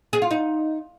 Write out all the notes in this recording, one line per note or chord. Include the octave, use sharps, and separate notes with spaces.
G#4
F4
D#4